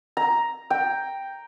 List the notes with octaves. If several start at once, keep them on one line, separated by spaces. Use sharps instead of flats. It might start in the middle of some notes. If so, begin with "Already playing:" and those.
A#5
G5